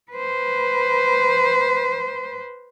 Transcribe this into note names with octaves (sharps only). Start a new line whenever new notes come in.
B4 C5